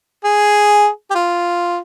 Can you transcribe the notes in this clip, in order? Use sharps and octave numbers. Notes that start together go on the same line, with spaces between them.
G#4
G4
F4